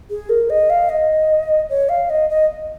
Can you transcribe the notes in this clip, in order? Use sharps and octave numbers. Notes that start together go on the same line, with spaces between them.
G#4
A#4
D#5
F5
D#5
C#5
F5
D#5
D#5